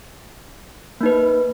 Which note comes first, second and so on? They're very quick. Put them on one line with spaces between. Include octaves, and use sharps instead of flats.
A#3 D#4 B4